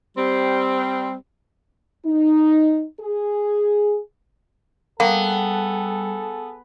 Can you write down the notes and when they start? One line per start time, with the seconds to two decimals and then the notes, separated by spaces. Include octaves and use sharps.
0.16 G3 C4
2.05 D#4
3.00 G#4
5.00 G3 A#3 B3 G#4 A4